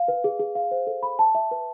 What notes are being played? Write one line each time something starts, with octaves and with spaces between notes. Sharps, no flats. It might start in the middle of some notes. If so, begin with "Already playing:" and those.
Already playing: F5
B4
G#4
G#4
F5
C5
A4
B5
A5
E5
B4